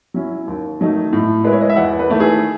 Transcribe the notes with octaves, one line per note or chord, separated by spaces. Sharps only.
F#3 C#4 E4
D#2
D#3 F#3 A3 D#4
A2
G#3 B3 E4 B4
C#5
D#5
E5
E2 F#5
B4
D#3 A3 E4
G#4